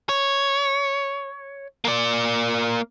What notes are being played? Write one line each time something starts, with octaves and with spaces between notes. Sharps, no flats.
C#5
A#3 D5